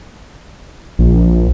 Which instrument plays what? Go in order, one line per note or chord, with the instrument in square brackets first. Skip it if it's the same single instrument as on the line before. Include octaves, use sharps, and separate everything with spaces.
[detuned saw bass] A#1